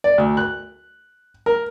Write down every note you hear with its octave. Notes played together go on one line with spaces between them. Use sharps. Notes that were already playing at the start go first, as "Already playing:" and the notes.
D5
D2
F#6
A#4